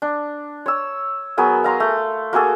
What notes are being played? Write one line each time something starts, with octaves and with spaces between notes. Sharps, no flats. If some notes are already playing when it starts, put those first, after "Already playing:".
D4
C#5 E6
F#3 B3 G#4 A#4
F5 A#5 C6
A3
A#3 F#4 G#4 A4